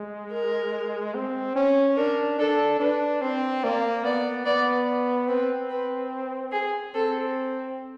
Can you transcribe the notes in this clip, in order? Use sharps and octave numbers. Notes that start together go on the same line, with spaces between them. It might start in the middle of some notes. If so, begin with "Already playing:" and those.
Already playing: G#3
A#4
C4
C#4
D4 A#4
D4 A4
D4 B4
C4 C5
A#3 D5
B3 D5
B3 D5
C4 B4
B4
G#4
C4 A4